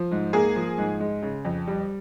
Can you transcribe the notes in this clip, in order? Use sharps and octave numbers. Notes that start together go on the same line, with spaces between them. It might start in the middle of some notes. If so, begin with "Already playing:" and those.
Already playing: F3
G#2
A#3 G#4
F3
G#2
G#3
C#3
F2
G3